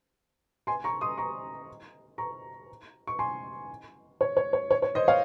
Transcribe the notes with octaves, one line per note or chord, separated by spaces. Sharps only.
G#5 C6
A#5 C#6
C6 D#6
A#5 C#6
A#5 C#6
C#6
G#5 C6
C#5
C#5
C#5
C#5
C#5
C5 D#5
C#5 F5